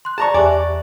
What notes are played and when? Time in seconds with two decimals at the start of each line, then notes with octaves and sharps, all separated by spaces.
0.05 C6 F#6
0.18 G#4 D5 A5 A#5 C#6
0.34 E2 G4 D5 E5 G#5 C#6 F#6